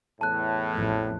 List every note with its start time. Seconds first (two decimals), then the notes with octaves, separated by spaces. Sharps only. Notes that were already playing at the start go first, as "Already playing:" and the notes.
0.21 E2 A2 A5 F#6
0.74 A1 F2